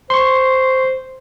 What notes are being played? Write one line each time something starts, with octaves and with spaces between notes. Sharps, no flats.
C5 C6 C#6